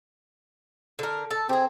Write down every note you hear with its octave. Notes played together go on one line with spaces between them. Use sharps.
D3 A#4
A4
C4 G4 G#4